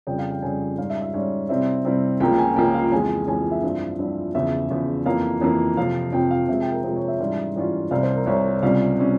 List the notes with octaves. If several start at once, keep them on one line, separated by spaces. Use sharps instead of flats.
F2 C#3 G3 G5
F5
G5
F2 C#3 G3 G#5
G#2 G3 C#4 F5
E5
E5
G#2 G3 C#4 C#5
C3 G3 C4 E4 E5
C3 G3 C4 E4
C#2 C#3 F3 A#3 G5
G5
G#5
C#2 C#3 F3 A#3 G5
F5
F2 E3 G#3 G#5
F2 E3 G#3 G#5
E5
G2 F3 C4 E4
G2 F3 C4 E4
E2 C#3 F3 E5
E2 C#3 F3
F2 E3 A#3 F5
F2 E3 A#3
F2 C3 F3 F5
F2 C3 F3 G5
F5
C3 F3 G#3 E5
G5
A#4
C3 F3 G#3 C5
C#5
E5
G#2 E3 G3 C#4 F4 E5
G#2 E3 G3 C#4 F4
C2 C3 G3 C4 F5
C5
A#4
C2 C3 G3 C4 C#5
C#2 C3 G3 C#4 F5
C3 G3 C#4